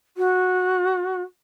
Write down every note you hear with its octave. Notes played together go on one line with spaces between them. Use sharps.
F#4